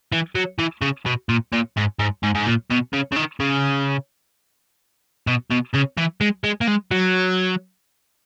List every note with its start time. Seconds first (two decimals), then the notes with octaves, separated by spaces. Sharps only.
0.12 E3
0.35 F#3
0.59 E3
0.82 C#3
1.06 B2
1.29 A#2
1.52 A#2
1.77 G#2
1.99 G#2
2.23 G#2
2.35 G#2
2.46 A#2
2.70 B2
2.93 C#3
3.12 C#3
3.16 D#3
3.40 C#3
5.27 B2
5.50 B2
5.74 C#3
5.97 E3
6.21 G#3
6.44 G#3
6.61 A#3
6.68 G#3
6.91 F#3